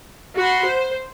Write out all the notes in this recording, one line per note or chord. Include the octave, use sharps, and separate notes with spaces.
F#4 F#5 B5 C6
C5